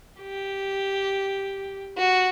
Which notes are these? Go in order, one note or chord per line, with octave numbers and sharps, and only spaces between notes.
G4
F#4